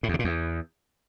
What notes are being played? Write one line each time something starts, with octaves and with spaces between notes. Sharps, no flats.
A2
E2
D3
A#2
E2